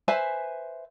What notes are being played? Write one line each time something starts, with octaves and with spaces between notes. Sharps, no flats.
B4 C5 E5 G#5